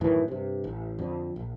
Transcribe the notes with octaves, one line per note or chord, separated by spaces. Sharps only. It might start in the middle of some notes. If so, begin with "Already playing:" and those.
F#2 A2 D#3 E3
G2 C3
A1
F2 D3
A#1